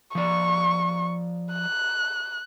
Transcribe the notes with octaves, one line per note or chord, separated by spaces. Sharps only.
F3 D5 C#6
F#6